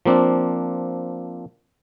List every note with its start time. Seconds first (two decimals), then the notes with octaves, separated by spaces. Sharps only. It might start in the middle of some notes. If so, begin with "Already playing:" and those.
0.06 F3 A#3 C4 D4